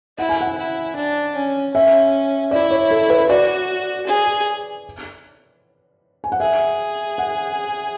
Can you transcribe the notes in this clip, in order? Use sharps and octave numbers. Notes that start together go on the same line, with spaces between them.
E4 F#5
G#5
F#5
E4
D4
C#4
C#4 E5
E4 D5
C#5
A4
B4
F#4 D5
G#4
G#5
F#5
G#4 E5
F#5